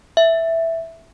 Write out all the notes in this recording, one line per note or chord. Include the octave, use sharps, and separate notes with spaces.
E5